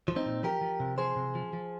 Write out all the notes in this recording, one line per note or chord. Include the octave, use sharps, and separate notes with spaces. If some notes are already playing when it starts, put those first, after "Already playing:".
F3
C4 D#4
A#2
F3 G4 A#4
F3
C3
F3 G#4 C5
C3
F3
F3